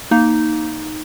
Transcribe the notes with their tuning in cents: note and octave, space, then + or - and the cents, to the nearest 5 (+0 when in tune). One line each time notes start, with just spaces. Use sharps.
A#3 +0 D#4 +0